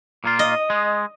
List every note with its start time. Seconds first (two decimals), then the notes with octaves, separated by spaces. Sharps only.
0.24 A#2 A#3 F4
0.39 D#5
0.70 G#3